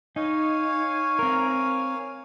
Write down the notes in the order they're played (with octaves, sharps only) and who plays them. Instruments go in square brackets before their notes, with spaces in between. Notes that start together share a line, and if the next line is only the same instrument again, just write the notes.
[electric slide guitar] D#4 [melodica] C#5 F5 G#5
[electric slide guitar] C4 A#4